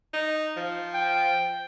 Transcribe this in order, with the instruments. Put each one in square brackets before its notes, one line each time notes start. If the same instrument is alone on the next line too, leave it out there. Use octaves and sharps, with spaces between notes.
[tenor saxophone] D#4
F3
[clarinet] G5